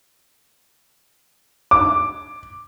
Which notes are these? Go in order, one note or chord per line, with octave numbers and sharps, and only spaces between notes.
D6